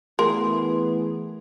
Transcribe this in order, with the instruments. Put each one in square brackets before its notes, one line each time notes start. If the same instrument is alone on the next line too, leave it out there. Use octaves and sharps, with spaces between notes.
[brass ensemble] E3 B3 [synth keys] A3 G#4 [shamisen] A#4 [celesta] C6